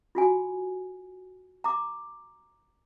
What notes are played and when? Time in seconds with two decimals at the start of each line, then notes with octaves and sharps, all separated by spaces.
0.15 F4 F#4 G#5
1.64 A#5 D6